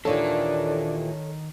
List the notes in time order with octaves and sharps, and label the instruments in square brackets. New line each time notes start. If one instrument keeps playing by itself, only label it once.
[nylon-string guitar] D#2 A#2 E3 [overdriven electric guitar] D#3 [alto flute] D4 [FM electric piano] A4 C#5